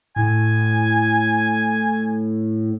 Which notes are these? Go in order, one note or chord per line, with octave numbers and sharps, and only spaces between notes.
A2 G#5